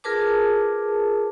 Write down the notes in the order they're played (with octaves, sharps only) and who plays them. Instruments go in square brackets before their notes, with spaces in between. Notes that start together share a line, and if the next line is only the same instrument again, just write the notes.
[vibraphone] F4 G#4 A#4 B4 A5 D6